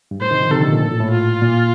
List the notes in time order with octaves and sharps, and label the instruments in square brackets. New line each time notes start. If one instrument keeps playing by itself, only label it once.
[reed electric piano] G2
[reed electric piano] A2 [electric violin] C5
[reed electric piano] C3 D#3
D3 F3
[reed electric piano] C3 D#3 [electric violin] A4
[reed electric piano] A#2 D3
A#2
A2
A#2
A2
[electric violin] F4
[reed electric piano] A#2